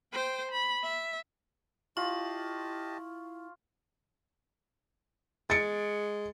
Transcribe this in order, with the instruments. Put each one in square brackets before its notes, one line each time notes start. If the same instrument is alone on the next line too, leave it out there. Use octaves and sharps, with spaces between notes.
[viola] C5 G5
B5
E5
[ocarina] E4 [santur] F4 [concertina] G4 D#5 A5 [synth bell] C#6
[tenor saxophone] G#3 [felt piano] A6 C#7 D7